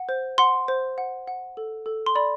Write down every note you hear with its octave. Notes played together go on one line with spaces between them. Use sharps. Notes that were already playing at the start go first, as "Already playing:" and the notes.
Already playing: F#5
C5
F#5 C6
C5
F#5
F#5
A4
A4
C6
D5 B5